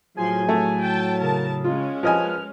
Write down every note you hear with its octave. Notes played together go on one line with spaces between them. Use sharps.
A2 F3 F#3 G#4 G#5 C6
A3 C#5
G5 A5
C#3 A#4 A5
G#3 C#4 F4
F#2 F3 B4 D#5 G#5 F6